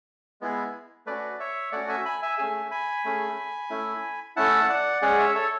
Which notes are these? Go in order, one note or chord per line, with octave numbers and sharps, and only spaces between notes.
G#3 B3 E4 G#4
A3 C#4 F#4 B4 D5
C#5 E5
A3 C#4 F#4 D5 F#5
E5 G#5
G#5 B5
E5 G#5
A3 C#4 G#4 E5 G#5
G#5 B5
A3 C#4 G#4
A3 C#4 E4
A3 C#4 E4 F#5 A5
D5 F#5
G#3 C#4 G#4 D5 F#5
C#5 E5
A4 C#5